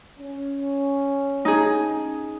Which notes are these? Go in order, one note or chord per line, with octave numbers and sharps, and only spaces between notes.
C#4
D#4 G#4